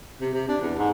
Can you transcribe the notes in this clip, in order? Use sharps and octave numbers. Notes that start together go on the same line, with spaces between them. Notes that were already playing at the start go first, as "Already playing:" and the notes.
C3
C3
D4
E2
G#2